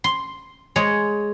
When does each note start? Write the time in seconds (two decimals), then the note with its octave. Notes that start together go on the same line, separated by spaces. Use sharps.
0.04 C6
0.76 G#3 C#5